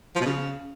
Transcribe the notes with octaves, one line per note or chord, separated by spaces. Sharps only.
F3
B2
C#3